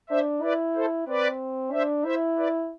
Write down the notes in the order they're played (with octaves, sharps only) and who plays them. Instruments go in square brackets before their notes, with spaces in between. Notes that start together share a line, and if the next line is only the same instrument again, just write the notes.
[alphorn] D4 [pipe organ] C5 E5
[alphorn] E4 [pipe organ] B4 D5
[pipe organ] A4 C5
[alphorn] C4 [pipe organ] B4 D5
[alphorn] D4 [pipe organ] C5 E5
[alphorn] E4 [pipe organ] C5 E5
[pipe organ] B4 D5